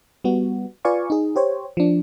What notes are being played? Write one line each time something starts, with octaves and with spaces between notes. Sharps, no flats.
G3 B3 F#4
F4 B4 D5 F5 G#5 C#6
D#4 G#4
G4 C5 C#5
F3 D4